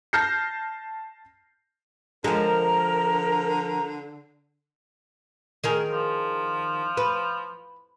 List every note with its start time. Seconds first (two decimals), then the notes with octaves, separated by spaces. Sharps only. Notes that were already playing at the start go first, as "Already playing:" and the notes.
0.13 A5 F6 G6 A#6 C7
2.24 D3 F3 G#3 A#4 A#5
5.64 D#3 G#4 A#4
5.92 F3
6.97 B4